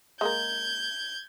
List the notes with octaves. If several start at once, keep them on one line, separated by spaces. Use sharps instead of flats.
G#3 A#3 A#4 G6 G#6